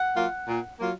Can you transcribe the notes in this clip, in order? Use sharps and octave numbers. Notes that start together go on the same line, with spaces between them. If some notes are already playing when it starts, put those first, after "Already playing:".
Already playing: F#5
F#3 A#3 F4
A#2
F#3 A#3 F4